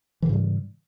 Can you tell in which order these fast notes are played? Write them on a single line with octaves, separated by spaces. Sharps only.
E3 C#3 G#2 G3